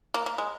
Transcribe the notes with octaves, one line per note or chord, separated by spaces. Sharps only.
A#3
A#3
G#3